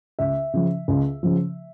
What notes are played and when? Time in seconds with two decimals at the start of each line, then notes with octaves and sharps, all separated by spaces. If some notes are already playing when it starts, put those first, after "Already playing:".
0.19 C#2 E5
0.53 C#3 F3
0.88 C#2
1.23 C#3 F3